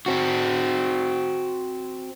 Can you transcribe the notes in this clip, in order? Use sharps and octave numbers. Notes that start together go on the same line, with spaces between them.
C4 F#4